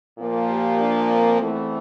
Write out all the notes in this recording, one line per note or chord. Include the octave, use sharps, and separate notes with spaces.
A#2 F3 A#3
G4
D4
C4
E2 E3 A3